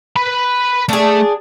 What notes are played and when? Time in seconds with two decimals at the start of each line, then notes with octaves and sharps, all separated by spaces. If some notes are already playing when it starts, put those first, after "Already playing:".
0.16 B4 B5
0.89 A3 D4 G#4